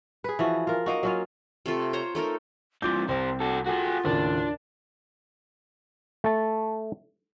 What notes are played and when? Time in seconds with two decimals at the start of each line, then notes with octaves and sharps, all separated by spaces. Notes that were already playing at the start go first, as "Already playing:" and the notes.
0.24 G#4 B4
0.39 E3 F3 F#4
0.67 F4 A#4
0.86 A#3 D#4 F#4
1.03 F#3 C#4 F4
1.66 C3 A3 F4 A4
1.93 C5 C#5 A#5
2.15 A3 D#4 A4 A#4
2.82 G2 E3 F4 C6 D6 G6
3.08 C2 G3 C4 C5
3.40 F#4 A4
3.67 F4 F#4 G#4 A4
4.05 D#2 A2 C#3 D4
6.24 A3 A5